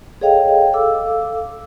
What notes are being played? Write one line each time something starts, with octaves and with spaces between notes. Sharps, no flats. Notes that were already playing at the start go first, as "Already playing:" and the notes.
G#4 A4 C#5 D#5 F5 G5
A4 F5 D6 E6